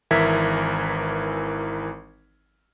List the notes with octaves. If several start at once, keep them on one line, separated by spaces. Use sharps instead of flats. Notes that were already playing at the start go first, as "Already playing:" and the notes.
G#1 E3 A#4 E5 G#6 B6